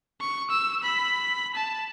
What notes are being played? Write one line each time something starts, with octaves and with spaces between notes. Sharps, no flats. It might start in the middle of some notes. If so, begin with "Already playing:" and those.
C#6
E6
B5
A5